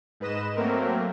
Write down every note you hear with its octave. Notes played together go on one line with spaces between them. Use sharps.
G#2 B4 D#5 E7
F#3 A3 A#3 C4 A#4